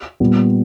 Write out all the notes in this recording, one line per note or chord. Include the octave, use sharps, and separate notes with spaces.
A#2 G3 B3